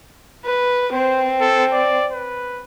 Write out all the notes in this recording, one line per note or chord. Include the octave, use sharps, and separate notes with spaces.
B4
C4 C5
A4
D5
B4